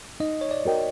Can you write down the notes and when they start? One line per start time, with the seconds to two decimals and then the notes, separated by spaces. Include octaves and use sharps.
0.20 D#4 D#5
0.41 C#5
0.51 D5
0.65 F#4 A#4 D#5 G5